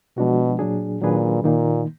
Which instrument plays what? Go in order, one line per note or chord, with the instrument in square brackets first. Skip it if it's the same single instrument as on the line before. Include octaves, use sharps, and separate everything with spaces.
[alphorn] B2 [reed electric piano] F3 G#3 D4 F#4
[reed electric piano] A#2 F#3 D4 G#4
[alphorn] A#2 [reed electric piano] D#3 F#3 D4 G#4 B4
[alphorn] A#2 [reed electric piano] D#3 A#3 D#4